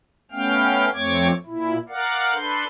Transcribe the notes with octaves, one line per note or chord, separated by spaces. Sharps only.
A3 B3 C#4 F5 G5 F6
F2 A3 C4 C#5 D6 G#6
A#2 E4
A#4 D5 F5 F#5
D4 A4 B4 C6 G6